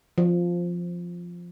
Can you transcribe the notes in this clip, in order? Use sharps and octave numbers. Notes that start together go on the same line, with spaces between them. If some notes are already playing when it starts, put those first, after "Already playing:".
F3